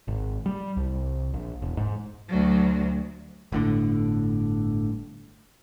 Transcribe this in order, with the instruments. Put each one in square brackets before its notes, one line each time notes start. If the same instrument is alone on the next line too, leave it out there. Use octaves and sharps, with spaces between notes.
[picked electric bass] G#1
G3
C2
A#1
E1
G#2
[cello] D2 F#3
[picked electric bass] G1 A2 D3